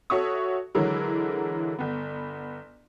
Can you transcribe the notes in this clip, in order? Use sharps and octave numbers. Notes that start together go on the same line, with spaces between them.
F#4 A4 C#5 E5 C#6 D#6
D3 E3 F#3 G#3 E4 A#4
G1 B3